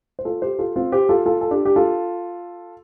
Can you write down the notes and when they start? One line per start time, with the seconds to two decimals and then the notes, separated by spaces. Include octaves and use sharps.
0.19 C5
0.25 F4 A4
0.42 G4 C5
0.59 F4 A4
0.76 C4 F4
0.92 G4 C5
1.09 F4 A4
1.26 F4 A4
1.41 A4
1.51 D4 G4
1.65 G4
1.76 F4 A4